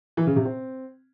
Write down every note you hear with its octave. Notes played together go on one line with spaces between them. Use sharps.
E3
C#3
C3
C4